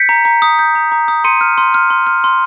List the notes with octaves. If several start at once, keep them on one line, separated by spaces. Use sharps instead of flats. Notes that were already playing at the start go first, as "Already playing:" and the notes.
Already playing: G6 B6 C#7
A#5
A#5
D#6
G6
A#5
A#5
D#6
C6 C#7 D#7
F6
C6
F6
C6
F6
C6